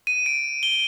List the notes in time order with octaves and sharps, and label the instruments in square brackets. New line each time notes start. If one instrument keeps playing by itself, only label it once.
[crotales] D#7
D7
G7